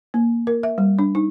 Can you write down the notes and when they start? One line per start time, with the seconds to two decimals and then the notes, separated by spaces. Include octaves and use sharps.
0.14 A#3
0.47 A#4
0.63 E5
0.78 G3
0.99 D4
1.15 D#4